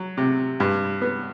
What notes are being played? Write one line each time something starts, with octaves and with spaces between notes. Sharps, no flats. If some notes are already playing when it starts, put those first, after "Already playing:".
Already playing: F#3
C3
G2
B3